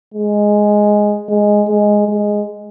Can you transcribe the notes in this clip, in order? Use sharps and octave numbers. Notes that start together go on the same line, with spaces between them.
G#3
G#3
G#3
G#3